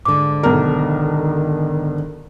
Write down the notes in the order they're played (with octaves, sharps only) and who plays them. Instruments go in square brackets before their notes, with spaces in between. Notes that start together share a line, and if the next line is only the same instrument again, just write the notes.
[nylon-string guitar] G#2 D3 [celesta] D6
[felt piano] B1 A#4 [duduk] D#3